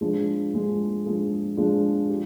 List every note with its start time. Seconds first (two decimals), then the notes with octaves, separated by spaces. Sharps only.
0.01 F3 G#3 D4 F4 G#4
0.53 F3 G#3 D4 F4 G#4
1.06 F3 G#3 D4 F4 G#4
1.57 F3 G#3 D4 F4 G#4
2.10 G4